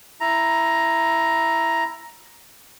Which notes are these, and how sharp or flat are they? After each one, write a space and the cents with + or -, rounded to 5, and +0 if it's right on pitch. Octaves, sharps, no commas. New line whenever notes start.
E4 +10 A#5 +5